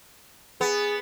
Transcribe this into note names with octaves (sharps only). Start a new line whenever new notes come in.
B3 G#4